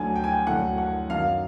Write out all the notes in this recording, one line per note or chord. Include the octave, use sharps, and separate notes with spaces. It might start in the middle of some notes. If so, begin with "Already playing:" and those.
Already playing: D2 D3 F#3 G#5
G5
G#5
G5
D2 D3 F#3 F#5
F#5
F#2 D#3 F#3 F5